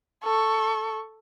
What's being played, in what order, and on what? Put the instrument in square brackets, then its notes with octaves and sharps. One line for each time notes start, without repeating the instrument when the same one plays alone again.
[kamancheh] A4 C#6